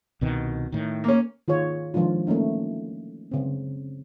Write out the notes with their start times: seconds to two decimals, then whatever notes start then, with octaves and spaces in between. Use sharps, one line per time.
0.21 C2 B2 D#3
0.72 A2 D#3
1.04 A#3 C#4
1.48 D#3 F4 G#4 C#5
1.94 D#3 F3 G#3 D4 F4
2.27 A3 A#3 C#4 D#4
3.31 C#3 C4